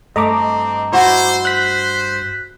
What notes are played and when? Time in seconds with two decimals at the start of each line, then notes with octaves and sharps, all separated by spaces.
0.16 G2 A3 C4 D#5 A#5 D6
0.93 E4 F#4 C5
1.45 C5 F#6 B6